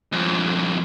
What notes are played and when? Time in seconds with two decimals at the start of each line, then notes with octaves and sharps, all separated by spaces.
0.12 F2 G#2